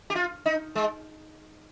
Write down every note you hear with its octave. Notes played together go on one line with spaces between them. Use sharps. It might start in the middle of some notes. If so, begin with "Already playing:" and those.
G4
F4
D#4
G#3